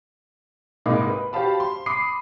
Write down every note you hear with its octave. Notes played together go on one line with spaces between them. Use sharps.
C2 G#2 A#3 D#5 B5 D6
B4
F#4 G4 C5 F5 A5 B5
C6
B5 D6 D#6 C7